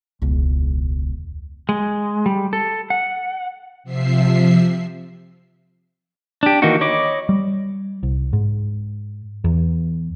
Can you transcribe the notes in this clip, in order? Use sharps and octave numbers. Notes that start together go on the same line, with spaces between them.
E1 C#2
G#3
G3
A4
F#5
C3 F3 E5 C7
D4 G4
D#3 E3 A#3 D#4 F#4
C#5 D#5 B5 D6
G3
C2
G#2
E2